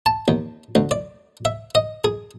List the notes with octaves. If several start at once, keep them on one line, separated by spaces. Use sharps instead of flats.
A5
D#2
D2
D5
E5
D#5
G#4